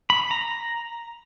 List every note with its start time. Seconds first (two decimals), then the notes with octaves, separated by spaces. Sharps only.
0.10 B5
0.31 A#5